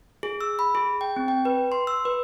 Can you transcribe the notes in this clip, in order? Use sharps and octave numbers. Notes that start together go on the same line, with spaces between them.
G#4
E6
B5
G#4
G5
C4
G5
B4
C6
E6
B4